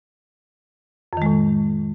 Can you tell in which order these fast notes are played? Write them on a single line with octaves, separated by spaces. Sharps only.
F2 D#3 G#3 A2